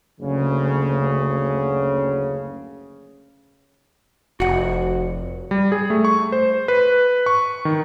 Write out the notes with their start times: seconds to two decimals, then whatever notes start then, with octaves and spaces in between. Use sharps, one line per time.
0.19 F#1 D2 C#3
4.40 F1 F#4 F#5
5.51 G3
5.72 G#4
5.90 A3
6.05 C#6
6.32 C5
6.68 B4
7.26 C#6
7.65 D#3